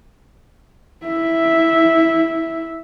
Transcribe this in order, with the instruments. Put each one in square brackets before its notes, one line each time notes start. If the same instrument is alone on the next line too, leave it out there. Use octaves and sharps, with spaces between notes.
[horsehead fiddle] E4 E5